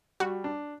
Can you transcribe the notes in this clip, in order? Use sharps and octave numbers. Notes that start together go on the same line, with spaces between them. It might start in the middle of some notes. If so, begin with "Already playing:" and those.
G3 F#4
D4